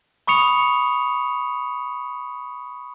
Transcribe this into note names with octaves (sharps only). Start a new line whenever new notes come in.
B5 C#6 D#6 C#7 F7